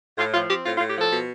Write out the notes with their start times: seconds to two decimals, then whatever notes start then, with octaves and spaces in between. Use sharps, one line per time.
0.17 A2 F4
0.33 F3 F4
0.49 C4 G4
0.65 A2 F4
0.77 F4
0.80 A2
0.89 G4
0.97 F3 A4
1.12 B2